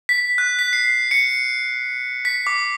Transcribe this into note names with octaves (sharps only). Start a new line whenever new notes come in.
B6
F#6
B6
C7
C#7
B6
D6